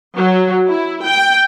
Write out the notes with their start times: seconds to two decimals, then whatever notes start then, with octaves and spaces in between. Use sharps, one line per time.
0.16 F#3
0.68 E4
1.04 G5